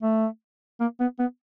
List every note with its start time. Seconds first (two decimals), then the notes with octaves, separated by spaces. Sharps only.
0.03 A3
0.80 A#3
1.00 B3
1.19 B3